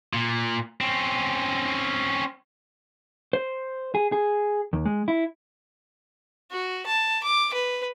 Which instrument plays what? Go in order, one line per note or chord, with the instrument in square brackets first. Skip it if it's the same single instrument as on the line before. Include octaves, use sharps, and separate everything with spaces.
[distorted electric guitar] A#2
C4 C#4
[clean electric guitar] C5
G#4
G#4
D#2
G#3
E4
[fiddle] F#4
A5
D6
B4